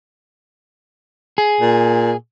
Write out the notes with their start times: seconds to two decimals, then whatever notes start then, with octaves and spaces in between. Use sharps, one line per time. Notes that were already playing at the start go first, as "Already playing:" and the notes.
1.38 G#4
1.61 A#2